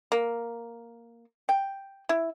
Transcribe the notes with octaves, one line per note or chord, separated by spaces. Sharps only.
A#3
G5
E4